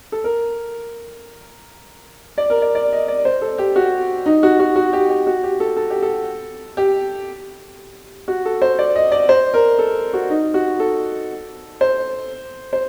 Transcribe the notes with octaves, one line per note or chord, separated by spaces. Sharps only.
A4
A#4
D5
A#4
D5
D5
D#5
D5
C5
A4
G4
F#4
D#4
F#4
F#4
F#4
G4
G4
F#4
G4
A4
A4
G4
A4
G4
F#4
A4
C5
D5
D#5
D5
C5
A#4
A4
F#4
D#4
F#4
A4
C5
C5